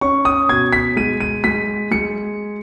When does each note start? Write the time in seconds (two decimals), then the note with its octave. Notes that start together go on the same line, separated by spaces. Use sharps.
0.01 C#4 C#6
0.25 D#6
0.49 B2 G#6
0.73 B6
0.96 G#3 D#7
1.20 D#7
1.44 G#3 B6
1.91 G#3 C#7